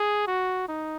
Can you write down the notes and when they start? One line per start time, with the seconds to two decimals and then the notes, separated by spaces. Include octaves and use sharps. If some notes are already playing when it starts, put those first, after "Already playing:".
Already playing: G#4
0.27 F#4
0.68 D#4